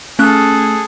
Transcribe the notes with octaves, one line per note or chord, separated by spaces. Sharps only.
A3 C#4 G#4 A4 F#6